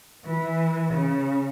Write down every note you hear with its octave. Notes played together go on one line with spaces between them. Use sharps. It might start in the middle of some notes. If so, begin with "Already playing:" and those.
E3
C#3